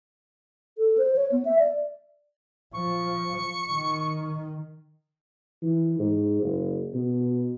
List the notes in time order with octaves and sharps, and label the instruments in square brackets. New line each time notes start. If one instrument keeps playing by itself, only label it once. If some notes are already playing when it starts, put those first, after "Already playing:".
[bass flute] A4
C5
C#5
B3
E5
D5
[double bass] F3 [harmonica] C#6
[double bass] D#3
[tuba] E3
G#2
F#1
B2